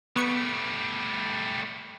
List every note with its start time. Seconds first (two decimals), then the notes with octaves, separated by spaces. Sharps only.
0.16 G3 A3 B3 C#6 C#7